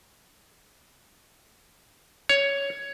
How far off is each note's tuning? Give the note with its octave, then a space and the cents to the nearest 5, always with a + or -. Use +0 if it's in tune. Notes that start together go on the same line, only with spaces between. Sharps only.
C#5 +10